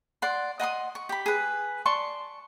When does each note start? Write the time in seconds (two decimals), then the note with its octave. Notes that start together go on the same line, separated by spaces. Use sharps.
0.22 D5 F#5 C6
0.60 D#5 F#5 C6 D#6
0.95 C#6
1.09 G4 B5
1.26 G#4 B4
1.86 D5 A5 C6 C#6